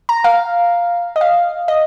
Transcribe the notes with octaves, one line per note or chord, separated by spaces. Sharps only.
A#5
F5
D#5
F5
D#5